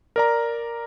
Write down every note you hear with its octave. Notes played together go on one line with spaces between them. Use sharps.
A#4 D5 A#5